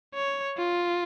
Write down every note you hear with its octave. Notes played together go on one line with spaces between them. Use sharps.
C#5
F4